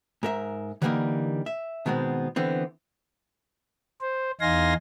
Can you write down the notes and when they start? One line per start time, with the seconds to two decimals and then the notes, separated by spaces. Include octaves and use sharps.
0.23 G#2 A#4 E5
0.82 D3 E3 G3 A3 A#3 D#4
1.46 E5
1.86 B2 D#3 G#3 B3 C4
2.36 D3 E3 B3 C4
4.01 C5
4.41 E2 D#4 F5 G#5 C6 A#6